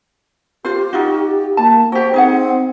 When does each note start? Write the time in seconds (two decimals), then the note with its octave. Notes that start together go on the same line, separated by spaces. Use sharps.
0.65 F4 G4 C5
0.93 D#4 F4 F#4
1.57 A#3 A5
1.92 F#4 G4 C5
2.14 C4 D#4 G#4 F#5